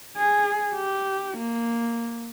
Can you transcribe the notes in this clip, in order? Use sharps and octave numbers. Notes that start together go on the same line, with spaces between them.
G#4
G4
A#3